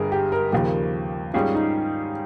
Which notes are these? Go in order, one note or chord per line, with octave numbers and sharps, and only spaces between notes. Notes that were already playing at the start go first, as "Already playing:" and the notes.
Already playing: G1 G2 G3 G#4 A#4
G4
A#4
D#2 C#3 F3 A#3 G4
G#2 G3 C#4 F4 G#4
D#4